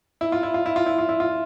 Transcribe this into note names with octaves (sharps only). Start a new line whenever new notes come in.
E4
F4
E4
F4
E4
F4
E4
F4
E4
F4